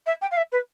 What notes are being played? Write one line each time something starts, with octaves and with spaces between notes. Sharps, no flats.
E5
G5
F5
E5
B4